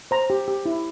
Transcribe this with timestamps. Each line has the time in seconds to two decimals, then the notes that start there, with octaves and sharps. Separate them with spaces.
0.11 C5 A#5
0.30 G4
0.48 G4
0.66 E4